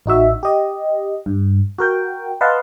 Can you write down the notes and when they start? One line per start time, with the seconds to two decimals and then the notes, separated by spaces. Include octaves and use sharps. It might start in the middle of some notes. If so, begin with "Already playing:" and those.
0.06 A1 D#4 F#4 E5
0.43 G4 D#5
1.26 G2
1.78 F#4 A#4 G5
2.41 B4 D#5 F5 F#5 A5 C6